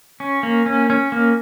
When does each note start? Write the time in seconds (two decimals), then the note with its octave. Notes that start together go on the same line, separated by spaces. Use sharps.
0.20 C#4
0.43 A#3
0.66 C#4
0.90 C#4
1.12 A#3